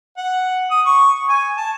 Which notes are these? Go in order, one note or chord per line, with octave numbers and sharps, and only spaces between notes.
F#5
D#6
C#6
G#5
A5